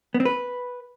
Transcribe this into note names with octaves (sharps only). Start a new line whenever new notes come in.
B3
C4
B4